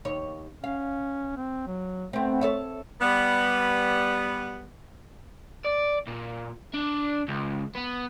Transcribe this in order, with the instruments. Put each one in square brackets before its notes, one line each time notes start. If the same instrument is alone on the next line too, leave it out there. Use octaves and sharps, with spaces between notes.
[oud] D#2 C#5
[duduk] C#4 [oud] F5
[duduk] C4
F#3
[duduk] A3 [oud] B3 C4
[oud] A4 C#5 E5
[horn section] G3 B3
[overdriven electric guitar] D5
A#2
D4
C#2
B3